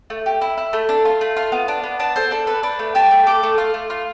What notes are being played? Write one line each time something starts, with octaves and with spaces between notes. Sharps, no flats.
A3
G4
E4
E4
A3
D4
F4
A3
F4
B3
D4
B3
D4 A5
A4 C5
D4 A4
A4 B4
D4 B4
A3
G4 A5
A3
A4 D6
A3
F4
A3
F4